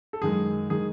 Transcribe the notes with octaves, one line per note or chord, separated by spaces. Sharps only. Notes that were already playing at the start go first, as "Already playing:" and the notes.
A4
F#2 D#3 G#3 G#4
D#3 G#3 G#4